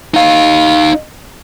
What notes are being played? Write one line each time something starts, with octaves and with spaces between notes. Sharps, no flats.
D#4 F5